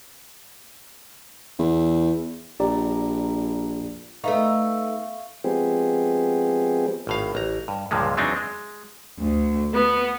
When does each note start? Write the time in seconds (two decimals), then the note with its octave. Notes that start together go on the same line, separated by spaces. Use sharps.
1.59 E2
2.60 A#1 G4 D5 A#5
4.24 A3 B3 D#4 E5 F5 C#6
5.44 F3 G#3 B3 C4 G4 G#4
7.07 G#1 A2 F5
7.35 A1 A#5
7.68 G2
7.91 C#2 G2 A#2 D3 F3 G#3
8.17 E2 F#3 G#3 C4 D4 D#4
8.36 G#3
9.20 D2
9.74 B3